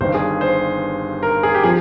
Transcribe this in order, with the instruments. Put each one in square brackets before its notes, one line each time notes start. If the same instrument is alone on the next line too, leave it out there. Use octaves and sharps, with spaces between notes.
[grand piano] G1 G2 D#3 C5
G#4
C5
A#4
G#4
G4
F3 G#4